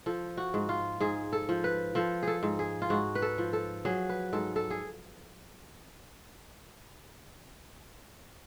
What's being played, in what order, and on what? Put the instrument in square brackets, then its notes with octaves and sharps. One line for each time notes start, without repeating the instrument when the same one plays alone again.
[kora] F3 A4
F#4
G#2
F4
G#2 G#4
A4
F3
B4
F3 A4
G#4 A4
G#2
G#4
F4
G#2 F#4
B4
A4
F3
A4
F#3 G#4
B4
G#2 A4
A4
G#4